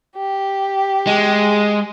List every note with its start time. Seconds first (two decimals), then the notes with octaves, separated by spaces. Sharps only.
0.17 G4
1.07 G#3